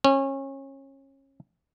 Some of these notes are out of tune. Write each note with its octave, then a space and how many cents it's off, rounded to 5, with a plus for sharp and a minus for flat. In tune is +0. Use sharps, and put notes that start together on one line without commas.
C#4 -30